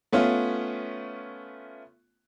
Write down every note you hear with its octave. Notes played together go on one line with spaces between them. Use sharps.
A3 B3 C#4 F4